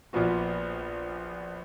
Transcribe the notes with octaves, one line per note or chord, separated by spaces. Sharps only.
A#1 A#2 F3 B3 F#4